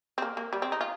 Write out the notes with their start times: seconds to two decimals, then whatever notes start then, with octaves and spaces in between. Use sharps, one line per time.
0.18 C4
0.22 A#3
0.37 A#3
0.53 G3
0.62 C4
0.72 D#4
0.81 F4